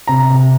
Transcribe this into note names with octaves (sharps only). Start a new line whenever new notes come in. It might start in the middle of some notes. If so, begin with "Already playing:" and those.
C3 A#5
C3